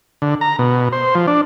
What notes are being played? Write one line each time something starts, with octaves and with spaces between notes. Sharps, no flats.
D3
A#5
B2
C5
F3
D4